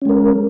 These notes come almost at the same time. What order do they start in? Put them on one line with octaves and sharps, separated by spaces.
C#4 G#3 A#4